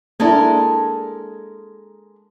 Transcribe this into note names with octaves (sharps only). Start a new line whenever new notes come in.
G#3 A#3 D4 E4 A4 A#4